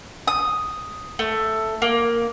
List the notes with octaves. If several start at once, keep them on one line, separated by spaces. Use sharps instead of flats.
D#6
A3
A#3